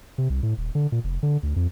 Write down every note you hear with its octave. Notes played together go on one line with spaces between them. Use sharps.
C3
C2
A2
D#1
D3
A#2
F1
D3
D2
F2